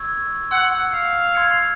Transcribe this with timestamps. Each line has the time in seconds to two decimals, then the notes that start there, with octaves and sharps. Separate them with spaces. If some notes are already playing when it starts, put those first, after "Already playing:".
Already playing: C#6 E6 G#6
0.51 F#5 C6 E6 G6
0.93 F5
1.35 C6 E6 G#6 C#7